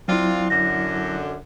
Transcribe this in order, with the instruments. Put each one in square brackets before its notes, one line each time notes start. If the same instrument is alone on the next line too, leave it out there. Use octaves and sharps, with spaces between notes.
[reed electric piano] F#3 E4 [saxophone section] C4 D4 F4
[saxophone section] F#2 D3 [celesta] A#6